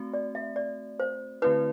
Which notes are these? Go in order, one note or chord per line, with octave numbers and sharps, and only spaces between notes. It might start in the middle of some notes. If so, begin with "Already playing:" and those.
Already playing: A3 C4 F#4
D5
E5
D5
C5
D3 A3 C4 E4 B4